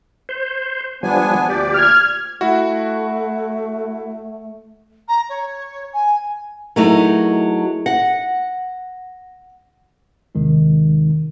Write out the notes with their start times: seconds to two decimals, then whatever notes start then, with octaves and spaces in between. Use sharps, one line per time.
0.29 C5
1.03 F3 G3 B3 D4 G#5
1.48 D2 A#2 G4 D5
1.74 F6 G#6
2.41 A3 E4 F#4
5.08 A#5
5.29 C#5
5.93 G#5
6.76 F#3 A3 D#4 E4 G#4 A#4
7.86 F#5 A#6
10.35 D#2 C3 D#3 G#3 D#4